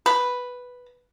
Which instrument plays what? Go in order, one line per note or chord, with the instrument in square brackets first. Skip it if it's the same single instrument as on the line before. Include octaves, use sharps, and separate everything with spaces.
[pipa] B4